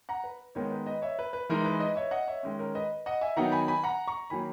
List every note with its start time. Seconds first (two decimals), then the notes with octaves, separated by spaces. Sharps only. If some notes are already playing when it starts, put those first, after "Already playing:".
0.09 F#5 A#5
0.24 B4
0.55 D#3 G#3 B3 D#4 A#4 C#5
0.71 B4
0.86 B4 D#5
1.02 C#5 E5
1.19 B4
1.33 B4
1.49 E3 G#3 D#4 A#4
1.65 B4
1.80 B4 D#5
1.96 C#5 E5
2.11 D#5 F#5
2.27 C#5 E5
2.43 D#3 G#3 C#4
2.59 A#4 C#5
2.75 B4 D#5
3.06 D#5 F#5
3.21 E5 G#5
3.36 D#3 F#3 B3 D#4 F#5 A#5
3.52 G#5 B5
3.68 G#5 B5
3.84 F#5 A#5
4.07 A#5 C#6
4.30 D#3 F#3 A#3 G#5 B5